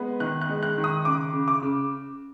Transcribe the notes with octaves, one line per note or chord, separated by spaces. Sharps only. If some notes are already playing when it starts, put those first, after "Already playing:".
Already playing: G#3 B3
D#3 F#6
F#6
G#3
F#6
D#3
D#6
C#3 D6
C#3
D6
C#3